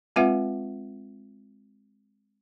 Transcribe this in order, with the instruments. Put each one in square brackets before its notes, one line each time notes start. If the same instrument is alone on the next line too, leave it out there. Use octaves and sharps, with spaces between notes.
[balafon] G#3 C4 F4 B4 E5 F#5